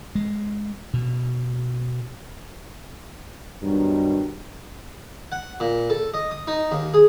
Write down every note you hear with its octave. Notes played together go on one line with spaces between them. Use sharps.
G#3
B2
G2 B2 D#3 F#3
F#5
A#2
A4
D#5
D#6
D#4
D#2
G#4